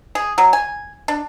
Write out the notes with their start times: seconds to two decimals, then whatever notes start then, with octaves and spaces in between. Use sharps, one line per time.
0.15 G#4
0.38 F#3
0.53 G#5
1.08 D4